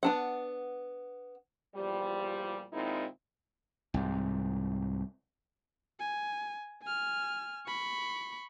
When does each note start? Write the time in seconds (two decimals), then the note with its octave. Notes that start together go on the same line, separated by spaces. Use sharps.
0.03 B3 D4 F#5
1.75 E2 A#2 F3 G3
2.73 A#2 D#3 G#3 C4 D#4 E4
3.94 C2 G#2
6.00 G#5
6.83 G#5 F6
7.66 B5 C#6